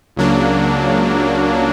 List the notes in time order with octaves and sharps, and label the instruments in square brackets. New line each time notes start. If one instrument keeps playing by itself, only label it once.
[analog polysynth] C#2 C#3 F#3 A#3 D4